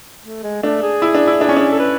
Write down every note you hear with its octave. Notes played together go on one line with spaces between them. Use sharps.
A3
G#3
A3 D4
G#4
E4
D4
E4
D4
C#4
D4
A4
B4